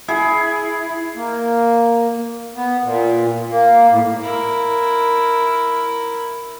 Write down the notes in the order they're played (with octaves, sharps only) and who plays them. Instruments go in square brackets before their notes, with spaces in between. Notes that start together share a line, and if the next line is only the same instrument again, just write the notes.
[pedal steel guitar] E4 [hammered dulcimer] G#4
[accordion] A#3
B3
A#2
A#3
A2
[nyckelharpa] E4 A#4